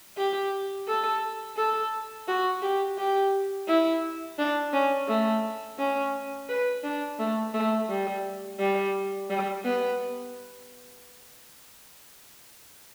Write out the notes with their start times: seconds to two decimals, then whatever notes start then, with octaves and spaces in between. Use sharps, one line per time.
0.17 G4
0.88 A4
1.57 A4
2.27 F#4
2.62 G4
2.98 G4
3.67 E4
4.38 D4
4.73 C#4
5.08 A3
5.78 C#4
6.49 B4
6.83 D4
7.19 A3
7.54 A3
7.89 G3
8.59 G3
9.30 G3
9.65 B3